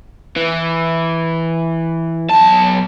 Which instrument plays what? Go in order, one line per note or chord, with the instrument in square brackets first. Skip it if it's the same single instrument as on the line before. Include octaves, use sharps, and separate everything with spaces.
[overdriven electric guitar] E3
B1 A5